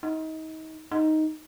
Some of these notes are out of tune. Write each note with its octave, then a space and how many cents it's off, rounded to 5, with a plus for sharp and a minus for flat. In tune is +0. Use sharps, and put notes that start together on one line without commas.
D#4 +30
D#4 +5